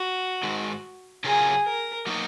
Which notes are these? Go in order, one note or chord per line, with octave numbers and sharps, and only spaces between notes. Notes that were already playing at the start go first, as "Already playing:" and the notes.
Already playing: F#4
G#2 D#3 G#3
C#3 F#3 C#4 F4 G#4 A#4
A#4
F#3 A#3 D#4 F#4